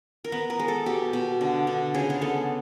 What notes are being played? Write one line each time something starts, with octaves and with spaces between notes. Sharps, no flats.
A#4
B3 B4
A#4
G#3
A4
B2 G4
B2
D3
D3
C#3 G#4
G#4
B3 A4